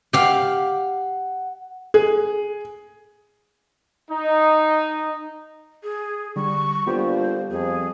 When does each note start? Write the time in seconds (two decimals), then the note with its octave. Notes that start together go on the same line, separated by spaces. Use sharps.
0.13 G4 F5 F#5
1.94 G#4
4.10 D#4
5.83 G#4
6.36 D3 G3 C#6
6.87 D3 G3 A#3 B3 F4 G4 C5
7.51 F2 G#4